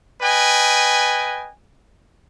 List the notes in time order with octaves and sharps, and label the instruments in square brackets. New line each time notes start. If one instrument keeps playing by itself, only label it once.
[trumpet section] B4 D#5 G5 G#5